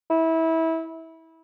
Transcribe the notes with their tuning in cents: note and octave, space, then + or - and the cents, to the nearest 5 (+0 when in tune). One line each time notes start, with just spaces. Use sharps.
E4 -25